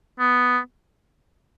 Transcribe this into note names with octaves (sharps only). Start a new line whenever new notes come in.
B3